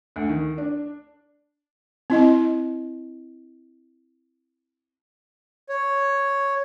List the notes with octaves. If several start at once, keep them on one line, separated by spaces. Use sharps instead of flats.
D2
D#3
D4
C4 E4 D#5
C#5